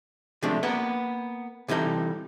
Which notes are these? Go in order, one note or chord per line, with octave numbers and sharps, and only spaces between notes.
C3 F3 G#3 A3 D4
A#3 B3 F#5
C3 E3 G3 D#4 A4